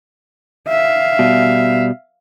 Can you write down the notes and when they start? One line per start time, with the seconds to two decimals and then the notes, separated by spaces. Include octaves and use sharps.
0.68 E5 F5
1.19 B2 G3